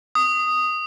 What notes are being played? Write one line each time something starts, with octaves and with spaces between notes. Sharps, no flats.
D#6